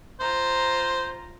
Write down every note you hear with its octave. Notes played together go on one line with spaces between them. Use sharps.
F4 C5 A#5